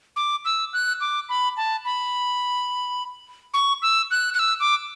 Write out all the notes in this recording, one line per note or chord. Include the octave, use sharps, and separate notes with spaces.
D6
E6
F#6
D6
B5
A5
B5
C#6
E6
F#6
F#6
E6
D6